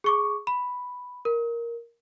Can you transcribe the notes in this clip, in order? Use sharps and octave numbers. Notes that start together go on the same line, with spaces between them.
G#4 C#6 D6
B5
A#4